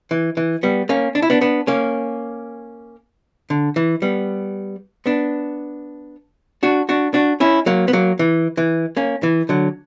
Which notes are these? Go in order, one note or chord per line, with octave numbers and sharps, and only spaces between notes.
E3
E3
G3 B3
A#3 C#4
D4
E4
B3 D4
B3 D4
A#3 C#4
D3
E3
G3 B3
B3 D4
D4 F#4
D4 F#4
D4 F#4
C#4 E4
F#3 A#3
B3
F#3 A#3
E3
E3
A#3 C#4
E3
D3 F#3